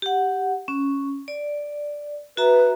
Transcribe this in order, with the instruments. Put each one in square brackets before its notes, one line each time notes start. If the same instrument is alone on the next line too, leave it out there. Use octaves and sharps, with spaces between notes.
[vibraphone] G4 F#5
C#4
D5
[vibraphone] F#4 E5 A#5 [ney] B4